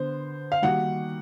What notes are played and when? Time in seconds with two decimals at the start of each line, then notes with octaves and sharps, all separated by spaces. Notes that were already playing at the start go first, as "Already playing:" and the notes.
Already playing: D3 B3 C5
0.52 F5
0.62 D#3 G3 A#3 D#4 F#4 F#5